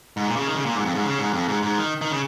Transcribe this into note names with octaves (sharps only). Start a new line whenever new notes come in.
G#2
A#2
C#3
D#3
C#3
A#2
G#2
F2
G#2
C#3
G#2
F2
G#2
G#2
D#3
D#3
C#3